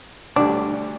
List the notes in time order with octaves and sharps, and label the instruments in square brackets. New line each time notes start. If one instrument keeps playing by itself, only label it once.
[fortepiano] D2 D3 G3 [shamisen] D4